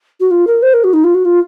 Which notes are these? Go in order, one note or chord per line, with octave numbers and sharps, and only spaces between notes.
F#4
F4
A#4
C5
A#4
F#4
D#4
F4
F#4
F4